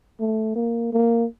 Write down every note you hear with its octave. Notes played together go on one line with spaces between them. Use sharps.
A3
A#3
A#3